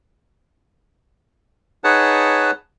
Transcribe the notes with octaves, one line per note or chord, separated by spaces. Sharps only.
D#4 G#4 B4 C#5 F#5 A5